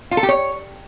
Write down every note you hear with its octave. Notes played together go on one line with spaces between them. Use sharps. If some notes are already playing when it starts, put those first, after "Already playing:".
F4
A4
G4
C#5